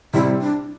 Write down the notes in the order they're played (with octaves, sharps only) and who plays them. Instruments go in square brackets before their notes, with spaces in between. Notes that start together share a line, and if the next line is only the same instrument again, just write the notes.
[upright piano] C3 G3 C4 [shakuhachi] E4
[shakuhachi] D4